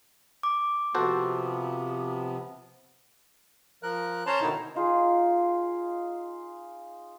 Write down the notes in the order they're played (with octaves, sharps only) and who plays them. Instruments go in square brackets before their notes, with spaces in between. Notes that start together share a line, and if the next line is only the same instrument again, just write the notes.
[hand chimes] D6
[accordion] C3 F3 B3 [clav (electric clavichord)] F#4 A4 C5
[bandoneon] F3 A#4 F#6
C#4 C5 C#5 A5 A#5 C6
B2 D3 D#3 D#4 E4
[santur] D#4 F4 G#4